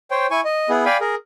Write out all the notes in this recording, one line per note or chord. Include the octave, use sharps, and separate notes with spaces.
C5 C#5 G5
E4 G#5 C#6
D#5
B3 E4 G#4
D5 F5 G5 G#5 B5
G#4 A#4